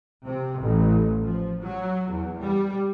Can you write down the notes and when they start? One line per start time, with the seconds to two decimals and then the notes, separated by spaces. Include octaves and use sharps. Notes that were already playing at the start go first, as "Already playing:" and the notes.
0.24 C3
0.61 A1
1.23 F3
1.61 F#3
2.10 E2
2.42 G3